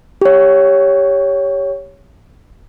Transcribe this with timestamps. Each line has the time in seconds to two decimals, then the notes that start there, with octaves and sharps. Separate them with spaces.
0.21 G4 C#5